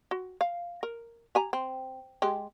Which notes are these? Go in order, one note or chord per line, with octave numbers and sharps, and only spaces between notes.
F#4
F5
A#4
G4 G#5 A#5
C4
G#3 G4